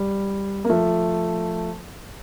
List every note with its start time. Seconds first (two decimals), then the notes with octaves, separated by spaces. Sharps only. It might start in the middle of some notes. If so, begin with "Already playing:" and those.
Already playing: G3
0.64 A#3
0.70 F3 A3